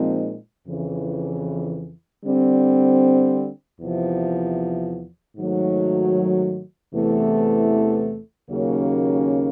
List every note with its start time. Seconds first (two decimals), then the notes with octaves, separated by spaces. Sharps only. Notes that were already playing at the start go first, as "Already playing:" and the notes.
Already playing: A#2 F3 G#3 C4 D#4
0.67 F2 C#3 E3
2.24 D3 G3 C4
3.80 E2 C3 F3
5.37 G#2 D#3 F#3 A3
6.93 E2 C3 E3 A3
8.50 D#2 C#3 F#3 A#3 C#4